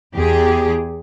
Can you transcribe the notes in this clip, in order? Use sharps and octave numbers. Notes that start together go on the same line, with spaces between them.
E2 G4 G#4